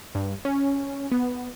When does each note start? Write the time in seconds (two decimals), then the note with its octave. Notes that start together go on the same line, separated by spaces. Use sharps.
0.15 G2
0.45 C#4
1.12 B3